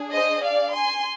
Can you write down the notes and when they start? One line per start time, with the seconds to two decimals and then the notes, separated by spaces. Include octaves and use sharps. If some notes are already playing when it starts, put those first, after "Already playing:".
Already playing: D4 G#4
0.11 C5 D#5
0.42 D5 F5
0.74 G#5 C6